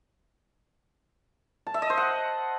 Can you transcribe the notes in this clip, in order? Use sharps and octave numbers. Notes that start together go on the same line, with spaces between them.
A5
E5
D#5
C5
F#5